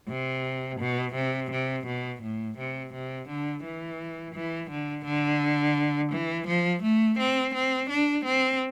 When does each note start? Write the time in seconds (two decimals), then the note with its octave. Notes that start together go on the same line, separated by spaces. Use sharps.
0.08 C3
0.80 B2
1.15 C3
1.51 C3
1.86 B2
2.22 A2
2.58 C3
2.93 C3
3.29 D3
3.64 E3
4.34 E3
4.70 D3
5.05 D3
6.12 E3
6.47 F3
6.83 A3
7.19 C4
7.54 C4
7.90 D4
8.25 C4